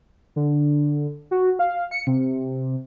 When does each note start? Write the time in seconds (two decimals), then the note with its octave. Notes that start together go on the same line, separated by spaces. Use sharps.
0.36 D3
1.31 F#4
1.59 F5
1.91 C#7
2.07 C3